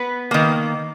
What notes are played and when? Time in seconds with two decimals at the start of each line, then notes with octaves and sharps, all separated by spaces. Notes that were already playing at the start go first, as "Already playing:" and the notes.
Already playing: B3 B4
0.31 D#3 A#3